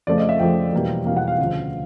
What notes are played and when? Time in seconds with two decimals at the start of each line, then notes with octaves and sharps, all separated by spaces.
0.07 F2 C#3 F3 A3 D5
0.18 D#5
0.29 E5
0.39 F2 C#3 F3 A3 G5
0.72 E2 B2 G3 A#3
1.06 E2 B2 G3 A#3 F5
1.17 F#5
1.28 F5
1.38 D2 C#3 F3